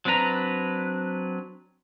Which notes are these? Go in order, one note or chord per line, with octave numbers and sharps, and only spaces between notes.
F#3 C4 D4 B4 A#5